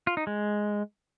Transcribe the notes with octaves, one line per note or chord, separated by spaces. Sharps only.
F4
D#4
G#3